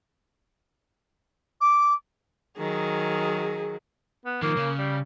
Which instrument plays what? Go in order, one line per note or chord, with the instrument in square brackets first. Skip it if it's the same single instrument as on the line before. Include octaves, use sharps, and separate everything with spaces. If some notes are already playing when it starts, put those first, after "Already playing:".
[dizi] D6
[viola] D#3 F#3 [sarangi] G#4
[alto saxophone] B3
[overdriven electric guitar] D#3 F3 [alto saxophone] A#3
[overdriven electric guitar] C#3
[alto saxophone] G3